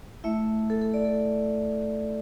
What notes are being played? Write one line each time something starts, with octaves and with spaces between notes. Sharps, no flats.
A3 E4 E5
A4
A4
D5
A4